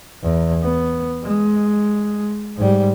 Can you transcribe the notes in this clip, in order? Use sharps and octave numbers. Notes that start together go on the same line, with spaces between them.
E2
B3
G#3
G#2 G3